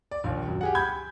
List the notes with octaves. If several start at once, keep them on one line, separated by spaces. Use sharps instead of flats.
D5
A#1 D#2
F#2
G4 G#4 F#5
B5 G6 G#6